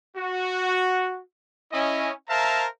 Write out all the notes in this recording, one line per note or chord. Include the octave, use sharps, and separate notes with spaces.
F#4
C#4 E4 D#5
A#4 C5 E5 F5 A5 A#5